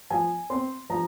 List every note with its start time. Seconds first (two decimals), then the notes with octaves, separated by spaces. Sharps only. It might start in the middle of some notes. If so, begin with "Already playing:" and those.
0.10 F3 G#5
0.50 C4 C6
0.90 F3 A#5